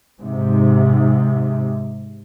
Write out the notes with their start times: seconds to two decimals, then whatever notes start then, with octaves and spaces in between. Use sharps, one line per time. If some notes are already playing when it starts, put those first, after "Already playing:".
0.21 G#2 C3